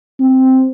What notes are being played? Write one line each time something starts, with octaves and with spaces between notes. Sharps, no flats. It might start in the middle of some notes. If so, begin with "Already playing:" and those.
C4